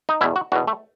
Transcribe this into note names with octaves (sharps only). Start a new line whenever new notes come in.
D#4
E2 B2 E4
F#4
E2 B2 F#4
A3